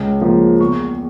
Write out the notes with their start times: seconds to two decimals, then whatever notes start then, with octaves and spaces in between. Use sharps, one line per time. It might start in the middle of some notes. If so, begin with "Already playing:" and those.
Already playing: C#2
0.21 C#3 F3 A#3
0.60 E2 C#6